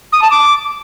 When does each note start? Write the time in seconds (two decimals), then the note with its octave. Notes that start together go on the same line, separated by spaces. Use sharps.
0.12 D#6
0.21 A5
0.30 D6